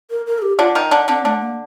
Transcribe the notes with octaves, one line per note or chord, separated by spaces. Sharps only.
A#4
A#4
A4
G4
D3 D4 F4
D#3 D#4
D3 D4
D3 C4 D4
D3 A3 D4
A#3